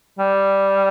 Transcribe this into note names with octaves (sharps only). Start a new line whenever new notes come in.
G3